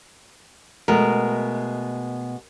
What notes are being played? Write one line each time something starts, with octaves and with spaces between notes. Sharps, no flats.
B2 G#3 A3 A#4